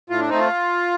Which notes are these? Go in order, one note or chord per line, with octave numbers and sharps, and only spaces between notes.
A2 F4
D4
A3 C4 D#4
F4